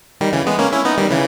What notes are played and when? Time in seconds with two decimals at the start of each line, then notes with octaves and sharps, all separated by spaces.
0.21 D#3 G3
0.33 C#3 E3
0.47 G#3 B3
0.59 A#3 C#4
0.72 C#4 E4
0.85 B3 D#4
0.98 D#3 G3
1.11 C#3 E3